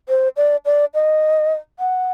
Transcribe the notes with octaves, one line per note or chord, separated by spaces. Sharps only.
C5
D5
D5
D#5
F#5